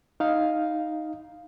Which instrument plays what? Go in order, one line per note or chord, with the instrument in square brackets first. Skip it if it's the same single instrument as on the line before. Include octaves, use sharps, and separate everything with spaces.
[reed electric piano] D#4 F5